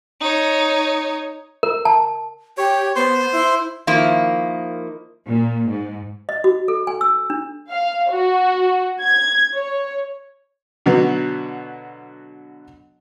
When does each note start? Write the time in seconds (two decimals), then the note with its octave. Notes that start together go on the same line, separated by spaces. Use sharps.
0.21 D#4 C#5
1.63 A#4
1.85 A5
2.58 G4 C#5
2.96 B3 C5 C6
3.32 E4
3.87 D#3 F3 A#3 E4
5.26 A#2
5.70 G#2
6.29 D#5
6.44 F#4
6.68 A4
6.87 G#5
7.01 E6
7.30 D4
7.70 F5
8.11 F#4
9.01 G#6
9.55 C#5
10.86 B2 D3 F#3 B3 F#4